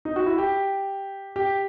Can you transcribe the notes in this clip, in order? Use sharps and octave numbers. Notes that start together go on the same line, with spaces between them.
D#4
F#4
E4
G4
G4